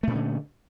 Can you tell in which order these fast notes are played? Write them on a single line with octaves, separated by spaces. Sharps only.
A3 A#2 C#4 D3